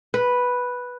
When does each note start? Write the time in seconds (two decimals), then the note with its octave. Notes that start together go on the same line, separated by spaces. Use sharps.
0.14 B4